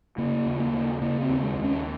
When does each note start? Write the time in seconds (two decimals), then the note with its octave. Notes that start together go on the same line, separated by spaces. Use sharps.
0.18 C#3 A#3
0.46 D#2
0.59 A#3
0.73 C#3
1.02 C#3 A#3
1.22 C4
1.29 D#2
1.43 G#3
1.57 D#2
1.64 C#4